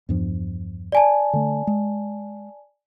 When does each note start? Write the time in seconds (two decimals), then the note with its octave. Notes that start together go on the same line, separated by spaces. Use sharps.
0.09 E2 G2 F3
0.92 D5 G#5 A5
1.33 D3 A3
1.67 G#3